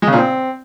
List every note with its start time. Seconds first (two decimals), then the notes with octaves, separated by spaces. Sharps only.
0.02 G#3
0.07 C#3
0.13 A#2
0.18 C4